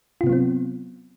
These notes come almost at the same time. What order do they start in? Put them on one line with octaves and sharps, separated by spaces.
F4 C3 B3 F#3 C4